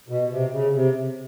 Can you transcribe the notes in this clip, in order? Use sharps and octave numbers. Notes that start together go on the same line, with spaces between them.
B2
C3
C#3
C3